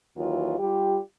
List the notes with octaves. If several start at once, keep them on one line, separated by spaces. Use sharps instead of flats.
D#2 E3 F#3 F4
G3 F4 G4